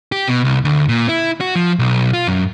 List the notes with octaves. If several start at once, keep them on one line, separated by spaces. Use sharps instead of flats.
G4
B2
C2
D2
A#2
E4
F#4
F3
B1
F4
F#2